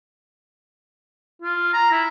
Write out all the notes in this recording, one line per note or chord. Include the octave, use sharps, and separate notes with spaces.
F4
A#5
E4